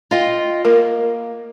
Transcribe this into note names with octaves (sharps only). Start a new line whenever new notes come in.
F4 D#5 G5
A#3 A#4